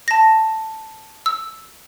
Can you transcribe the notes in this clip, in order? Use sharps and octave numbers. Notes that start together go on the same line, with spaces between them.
A5 A#6
E6